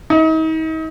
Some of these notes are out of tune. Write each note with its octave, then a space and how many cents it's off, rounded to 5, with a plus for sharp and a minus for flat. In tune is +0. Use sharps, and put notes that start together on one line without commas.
D#4 +40